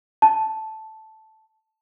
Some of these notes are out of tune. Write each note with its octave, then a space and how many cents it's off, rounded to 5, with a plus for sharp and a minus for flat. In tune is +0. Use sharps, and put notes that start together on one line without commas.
A5 -5